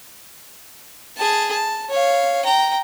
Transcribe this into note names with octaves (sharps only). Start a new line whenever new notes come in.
G#4 A5
A5
C#5 F5
G5 A#5